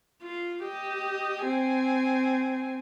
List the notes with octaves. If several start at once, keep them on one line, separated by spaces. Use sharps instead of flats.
F4
G4 D#5
C4 G#5